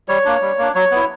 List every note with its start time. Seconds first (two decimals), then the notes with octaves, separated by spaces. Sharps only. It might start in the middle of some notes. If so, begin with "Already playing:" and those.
0.08 G3 C#5
0.25 A#3 D4
0.42 G3
0.59 A#3 D4
0.75 F#3 C#5
0.91 B3 E4